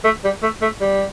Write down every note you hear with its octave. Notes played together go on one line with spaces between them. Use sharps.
A3
G3
A3
A3
G3